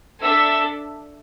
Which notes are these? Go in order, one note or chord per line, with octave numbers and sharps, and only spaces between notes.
D4 A4 E5 E6